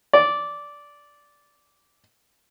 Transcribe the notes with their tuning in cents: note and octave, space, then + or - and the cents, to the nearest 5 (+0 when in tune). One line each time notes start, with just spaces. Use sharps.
D5 -10